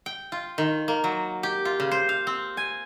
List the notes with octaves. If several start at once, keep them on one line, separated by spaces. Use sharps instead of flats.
G5
F4
D#3
A#3
F#3
G4
F4
C#3
C5
F5
C4
G#5